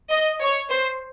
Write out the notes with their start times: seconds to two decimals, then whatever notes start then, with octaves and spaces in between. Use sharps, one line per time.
0.11 D#5
0.41 C#5
0.71 C5